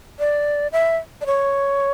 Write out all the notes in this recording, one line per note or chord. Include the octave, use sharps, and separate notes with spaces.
D5
E5
D5
C#5